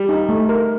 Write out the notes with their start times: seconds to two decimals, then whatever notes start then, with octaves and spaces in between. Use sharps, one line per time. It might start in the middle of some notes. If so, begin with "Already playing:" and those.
Already playing: G3
0.09 D#4
0.29 A3
0.49 A#4